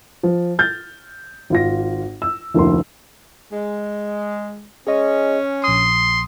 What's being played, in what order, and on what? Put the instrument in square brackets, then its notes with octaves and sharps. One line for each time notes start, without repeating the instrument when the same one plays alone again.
[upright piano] F3
F6 G6 A6
G#1 F4 A#6
E6
F1 D2 A#3 E4 C6
[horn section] G#3
[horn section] C#4 [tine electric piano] G#4 D#5
[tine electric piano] A#1 D#6 [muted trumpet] C6